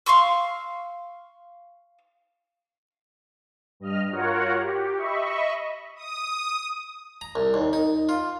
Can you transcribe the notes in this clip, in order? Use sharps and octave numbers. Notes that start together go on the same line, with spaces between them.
F5 C6 C#6 E6
G2 D#5 F6
F4 F#4 A#4 C#5 F#5
G4
D#5 E5 B5 C#6
D#6
A#5
C2
D#2
D#4
F4